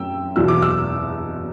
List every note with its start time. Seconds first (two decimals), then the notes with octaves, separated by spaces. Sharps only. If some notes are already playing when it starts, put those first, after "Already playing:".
Already playing: F#2 G5 E6
0.36 E2 B2 F#3 E6
0.48 D6
0.62 E6